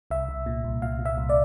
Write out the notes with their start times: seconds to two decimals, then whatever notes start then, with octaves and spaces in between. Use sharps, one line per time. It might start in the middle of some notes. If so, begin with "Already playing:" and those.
0.11 C2 E5
0.29 C2
0.46 A#2
0.64 C2
0.82 A#2 F5
0.99 A#2
1.05 E5
1.18 C2
1.29 D5